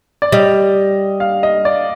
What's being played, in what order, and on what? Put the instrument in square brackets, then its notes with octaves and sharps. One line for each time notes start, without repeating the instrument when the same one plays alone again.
[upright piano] D5
[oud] G3 [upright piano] D#5
[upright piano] F5
D#5
D5